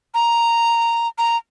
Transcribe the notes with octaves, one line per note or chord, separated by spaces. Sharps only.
A#5
A#5